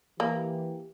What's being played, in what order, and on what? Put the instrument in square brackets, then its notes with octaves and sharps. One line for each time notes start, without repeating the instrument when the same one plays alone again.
[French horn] E3 [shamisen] A#3 [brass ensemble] G4